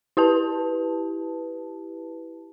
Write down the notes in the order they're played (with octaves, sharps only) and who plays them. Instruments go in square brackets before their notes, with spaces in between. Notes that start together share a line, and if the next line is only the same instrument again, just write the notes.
[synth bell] E4 G4 B4 A5